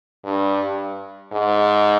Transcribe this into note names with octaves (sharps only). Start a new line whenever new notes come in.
G2
G#2